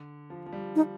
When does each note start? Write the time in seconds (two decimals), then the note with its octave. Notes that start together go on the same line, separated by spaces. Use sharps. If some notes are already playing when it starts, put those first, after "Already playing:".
Already playing: D3
0.30 F3
0.46 F3
0.52 G3
0.76 D#4